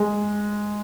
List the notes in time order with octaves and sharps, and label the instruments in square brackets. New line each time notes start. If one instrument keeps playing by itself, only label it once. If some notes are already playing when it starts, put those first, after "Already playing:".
Already playing: [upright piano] G#3